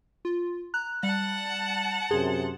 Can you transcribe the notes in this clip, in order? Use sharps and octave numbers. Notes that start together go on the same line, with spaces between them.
F4
A#5 F#6
G3 F#5 A5
F#2 C3 G#4 C6